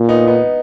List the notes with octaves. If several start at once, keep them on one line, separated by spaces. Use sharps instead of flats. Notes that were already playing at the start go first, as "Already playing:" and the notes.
Already playing: A#2
B3 D#4
B3 D#4